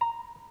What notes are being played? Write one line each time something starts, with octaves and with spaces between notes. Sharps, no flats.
A#5